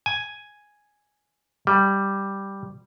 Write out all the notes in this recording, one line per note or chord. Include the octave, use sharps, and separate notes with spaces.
G#5
G3